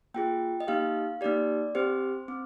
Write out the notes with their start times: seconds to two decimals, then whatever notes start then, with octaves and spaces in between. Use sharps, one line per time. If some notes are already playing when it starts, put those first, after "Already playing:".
0.14 A#3 F4 G#4 G5
0.60 D#5
0.67 A#3 D#4 G4 F5
1.21 A#3 D#4 G4 D5
1.75 C4 G4 C5
2.28 C4